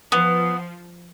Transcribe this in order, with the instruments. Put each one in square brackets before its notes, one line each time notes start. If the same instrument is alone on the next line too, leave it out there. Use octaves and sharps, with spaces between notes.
[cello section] F3 [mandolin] B3